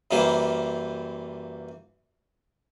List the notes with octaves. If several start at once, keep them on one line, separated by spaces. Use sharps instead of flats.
F#2 E3 G3 A#3 F4 C5